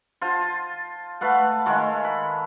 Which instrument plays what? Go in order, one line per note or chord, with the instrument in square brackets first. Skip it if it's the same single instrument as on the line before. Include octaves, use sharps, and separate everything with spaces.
[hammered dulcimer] F4 C5 A5
A3 B4 F5 F#5
D#3 G#3 A3
B5